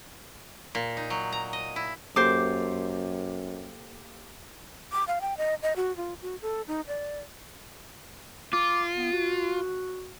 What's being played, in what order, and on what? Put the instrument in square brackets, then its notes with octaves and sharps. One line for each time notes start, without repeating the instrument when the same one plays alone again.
[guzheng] A#2
D#4
F#3
A#5
D#5
E4
[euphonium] F#2 [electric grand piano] A#3 G4 A4 [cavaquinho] C5 D6
[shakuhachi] D6
F5
G5
D#5
D#5
F#4
F4
F#4
A4
D#4
D5
[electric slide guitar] F4 [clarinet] D6
[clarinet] B3
F#4